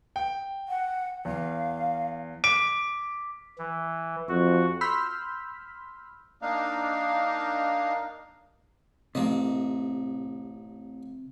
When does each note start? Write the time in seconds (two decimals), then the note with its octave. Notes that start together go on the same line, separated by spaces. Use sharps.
0.16 G5
0.68 F#5
1.25 E2 F5
2.44 D6 B6 D7
3.58 E3
4.29 F2 F#4
4.81 B5 C6 E6 F6 G6 B6
6.42 A#3 D4 D#4 F5
9.15 A1 C3 A#3 D#5